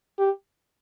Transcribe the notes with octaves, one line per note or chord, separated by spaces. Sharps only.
G4